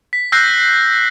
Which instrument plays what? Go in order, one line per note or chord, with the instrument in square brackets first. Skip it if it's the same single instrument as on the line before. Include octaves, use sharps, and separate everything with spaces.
[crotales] B6
E6 F#6 G6 A#6 C7